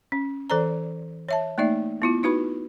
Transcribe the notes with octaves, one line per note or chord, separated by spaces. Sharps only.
C#4
E3 A4 C5 D5 A#5
C#5 E5 A5
A3 A#3 D#4 D5 E5
B3 E4 F4
D#4 E4 F#4 B4 B5